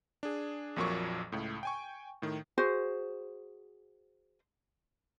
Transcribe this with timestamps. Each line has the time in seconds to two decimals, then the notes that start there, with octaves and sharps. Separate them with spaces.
0.23 D4 G#4
0.76 A#1 F2 A#2 F#3 A#3 C#6
1.32 C#2 A2
1.63 G5 G#5 C#6
2.22 A2 D#3
2.58 F#4 G#4 C5